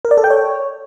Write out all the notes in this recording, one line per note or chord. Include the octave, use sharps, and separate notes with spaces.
A#4
D5
A4
G5
C#5